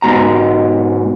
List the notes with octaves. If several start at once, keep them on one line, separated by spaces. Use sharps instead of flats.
G#2 B2 A#5